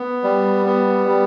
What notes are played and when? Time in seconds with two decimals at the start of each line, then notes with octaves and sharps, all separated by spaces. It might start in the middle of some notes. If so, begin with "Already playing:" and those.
Already playing: B3
0.24 G3
0.66 B3
1.08 G3